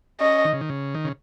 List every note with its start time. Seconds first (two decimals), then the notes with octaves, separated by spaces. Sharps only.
0.20 C#4 D#5
0.45 D#3
0.53 C#3
0.61 D#3
0.69 C#3
0.95 D#3
1.05 C#3